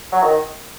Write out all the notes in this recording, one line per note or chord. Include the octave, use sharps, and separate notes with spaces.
F#3
D#3